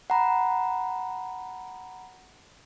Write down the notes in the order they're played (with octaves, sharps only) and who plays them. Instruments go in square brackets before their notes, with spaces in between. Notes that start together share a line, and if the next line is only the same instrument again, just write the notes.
[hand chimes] F#5 A#5 B5